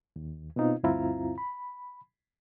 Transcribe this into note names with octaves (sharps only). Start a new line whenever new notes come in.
D#2
B2 B3 C4 D#4 F4
D2 G2 C4 E4 F4 A#5
B5